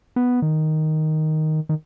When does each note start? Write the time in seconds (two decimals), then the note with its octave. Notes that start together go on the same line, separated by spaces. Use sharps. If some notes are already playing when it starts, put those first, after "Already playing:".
0.16 B3
0.42 D#3
1.69 D#3